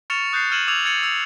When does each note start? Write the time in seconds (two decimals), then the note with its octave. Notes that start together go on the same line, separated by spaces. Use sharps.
0.10 C#6 F6 A6 C#7 E7 F7
0.33 D#6 F#6 G6 A6 C7
0.52 F6 G#6 D#7 E7 F#7
0.68 D6 E6 G#6 F7 F#7
0.85 E6 G#6 A6 C#7 D#7 F#7
1.03 E6 F7